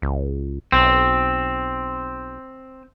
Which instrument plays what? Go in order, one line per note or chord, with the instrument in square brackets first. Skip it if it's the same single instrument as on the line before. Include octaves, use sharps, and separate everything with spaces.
[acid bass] C#2
[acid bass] B1 [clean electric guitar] C4